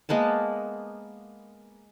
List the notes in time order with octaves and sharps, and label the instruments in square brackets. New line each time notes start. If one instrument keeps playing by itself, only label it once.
[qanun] G#3 A#3 B3 A5